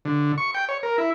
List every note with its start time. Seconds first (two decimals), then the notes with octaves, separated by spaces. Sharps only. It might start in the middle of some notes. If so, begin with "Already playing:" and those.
0.05 D3
0.38 C#6
0.55 G5
0.69 C#5
0.83 A#4
0.98 E4